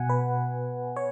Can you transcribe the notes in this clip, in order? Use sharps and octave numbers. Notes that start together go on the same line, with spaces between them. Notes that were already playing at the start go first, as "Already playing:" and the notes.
Already playing: B2 F#5 G#5
B4
C#5